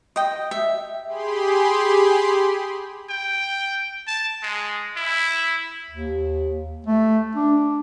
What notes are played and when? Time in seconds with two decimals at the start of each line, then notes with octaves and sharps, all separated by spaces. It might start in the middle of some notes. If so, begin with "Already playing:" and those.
0.16 D#5 G5
0.51 E5
1.06 G4 G#4 B5 C6
3.10 G5
4.07 A5
4.43 G#3
4.97 E4
5.91 D#2
6.87 A3
7.36 D4